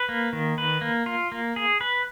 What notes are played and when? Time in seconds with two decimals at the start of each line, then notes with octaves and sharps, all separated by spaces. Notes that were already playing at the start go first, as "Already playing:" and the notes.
Already playing: B4
0.09 A#3
0.33 D#3
0.58 B4
0.81 A#3
1.06 F4
1.32 A#3
1.56 G#4
1.81 B4